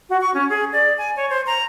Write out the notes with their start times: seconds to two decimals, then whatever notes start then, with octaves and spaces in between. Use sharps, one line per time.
0.10 F#4
0.21 C#6
0.34 C#4
0.50 G#4
0.73 D5
0.98 G#5
1.16 C#5
1.30 C5
1.46 A#5